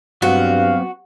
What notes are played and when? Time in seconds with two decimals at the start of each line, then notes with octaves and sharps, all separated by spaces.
0.22 G2 F#3 B3 C4 F#4 F5